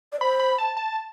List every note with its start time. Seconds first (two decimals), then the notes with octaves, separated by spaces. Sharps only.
0.13 D5
0.21 C5 B5
0.39 B5
0.58 A5
0.77 A5